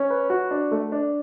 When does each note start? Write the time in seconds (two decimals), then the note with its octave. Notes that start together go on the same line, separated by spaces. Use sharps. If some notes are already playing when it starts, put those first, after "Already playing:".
Already playing: C#4
0.10 B4
0.30 F#4
0.51 D4
0.71 A3
0.92 D4